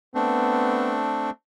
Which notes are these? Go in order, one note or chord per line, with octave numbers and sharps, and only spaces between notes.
A3 B3 C4 D4